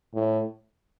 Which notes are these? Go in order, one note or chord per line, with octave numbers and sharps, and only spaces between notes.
A2